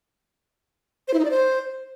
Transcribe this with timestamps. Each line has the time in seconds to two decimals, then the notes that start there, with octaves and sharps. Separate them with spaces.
1.08 C5
1.14 E4
1.19 D#4
1.25 D5
1.31 C5